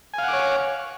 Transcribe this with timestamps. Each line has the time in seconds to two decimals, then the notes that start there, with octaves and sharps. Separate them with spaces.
0.14 G#5
0.18 F5
0.23 F#5
0.28 D6
0.33 C#5